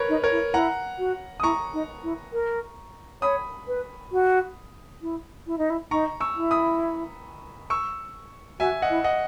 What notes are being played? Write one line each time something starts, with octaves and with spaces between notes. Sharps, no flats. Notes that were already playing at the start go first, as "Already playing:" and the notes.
Already playing: A#4 B4 C#5
D#4
A#4 C#5
E4
E4 F#5 A#5
F#4
D#6
E4 A#5 C#6
D#4
E4
A#4
C#5 B5 D#6
B4
F#4
E4
E4
D#4
E4
D#4 A#5 C#6
C#6 E6
E4
B5 D#6
C#6 E6
F#4 E5 G#5
D#5 F#5
E4
D#5 F#5